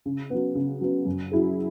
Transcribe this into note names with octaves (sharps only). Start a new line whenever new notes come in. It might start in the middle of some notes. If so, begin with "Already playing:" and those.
C#3
F#3 B3
C#3
F#3 B3
F#2
F#3 E4 G#4